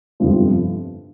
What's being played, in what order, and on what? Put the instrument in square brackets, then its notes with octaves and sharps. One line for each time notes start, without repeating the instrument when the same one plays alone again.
[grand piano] G1 F2 C3 F3